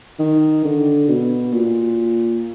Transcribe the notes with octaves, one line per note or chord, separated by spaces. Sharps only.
D#3
D3
B2
A#2